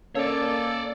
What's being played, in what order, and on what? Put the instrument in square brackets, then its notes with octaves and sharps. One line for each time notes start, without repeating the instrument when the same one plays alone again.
[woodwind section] A#3 [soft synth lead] C#4 [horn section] A4 [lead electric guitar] C#5 D5